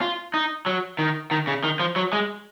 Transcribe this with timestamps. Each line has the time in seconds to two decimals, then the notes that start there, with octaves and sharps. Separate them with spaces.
0.01 F4
0.34 D#4
0.66 F#3
0.99 D#3
1.31 D#3
1.47 C#3
1.64 D#3
1.80 F3
1.96 F#3
2.13 G#3